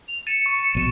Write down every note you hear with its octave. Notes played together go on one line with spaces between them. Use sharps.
F7
A6 C#7 D#7 E7
C#6
A#1 B2 D#7 E7